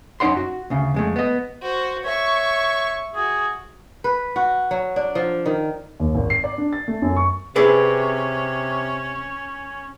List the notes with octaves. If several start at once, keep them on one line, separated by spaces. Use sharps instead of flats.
F#2 C#4 D#4 C#5 F#5 C6
F#4
D2 C#3
F2 G#3 A3
B3 D#5
F#4 C5
C#5 E5 C#6
F#4 G#4
B4
F#4
F#3
D4
F3
D#3
D#2
G#1
C7
D5
D4
A6
A3
F#2
C#6
C3 C#4 G#4 B4 D5